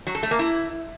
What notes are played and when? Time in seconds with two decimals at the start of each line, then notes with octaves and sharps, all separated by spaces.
0.07 F#3
0.15 A4
0.23 A3
0.31 A#3
0.39 E4